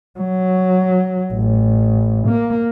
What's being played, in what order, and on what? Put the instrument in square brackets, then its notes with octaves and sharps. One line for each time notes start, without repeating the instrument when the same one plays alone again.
[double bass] F#3
A1
A#3